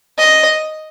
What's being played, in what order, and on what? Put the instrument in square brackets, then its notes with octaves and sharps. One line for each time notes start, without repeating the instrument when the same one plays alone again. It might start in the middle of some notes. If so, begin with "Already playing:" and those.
[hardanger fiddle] D#5